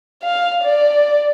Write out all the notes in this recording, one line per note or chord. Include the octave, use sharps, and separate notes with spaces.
F5
D5